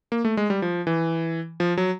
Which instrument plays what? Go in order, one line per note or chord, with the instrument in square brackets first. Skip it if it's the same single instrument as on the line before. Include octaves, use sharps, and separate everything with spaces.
[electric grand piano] A#3
A3
G#3
G3
F3
E3
F3
F#3